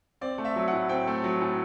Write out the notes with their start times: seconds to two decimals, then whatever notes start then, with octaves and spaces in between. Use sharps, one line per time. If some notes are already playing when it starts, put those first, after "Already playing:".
0.21 C4 D5
0.38 A3
0.45 E5
0.56 F#3
0.68 F#5
0.73 A2
0.89 C4 G5
1.07 A3
1.24 F#3
1.41 A2